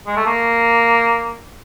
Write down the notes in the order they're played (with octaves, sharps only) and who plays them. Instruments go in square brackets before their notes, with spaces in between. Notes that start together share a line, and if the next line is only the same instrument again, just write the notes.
[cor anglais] G#3
A3
A#3